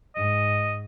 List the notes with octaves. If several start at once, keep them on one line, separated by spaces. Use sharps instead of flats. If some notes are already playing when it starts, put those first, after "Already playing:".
G#2 D#5